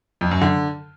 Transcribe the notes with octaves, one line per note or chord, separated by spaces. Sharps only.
F2
F#2
D3